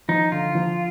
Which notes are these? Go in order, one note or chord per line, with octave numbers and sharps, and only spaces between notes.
F3 D#4
D3 F4
F3